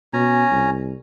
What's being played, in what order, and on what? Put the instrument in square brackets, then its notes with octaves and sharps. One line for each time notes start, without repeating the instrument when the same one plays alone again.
[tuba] B2 [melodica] C#4 G#5 A#5
[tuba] C2